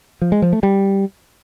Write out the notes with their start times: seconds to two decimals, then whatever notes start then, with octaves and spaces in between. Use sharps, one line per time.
0.22 F3
0.32 G#3
0.42 F3
0.53 A3
0.63 G3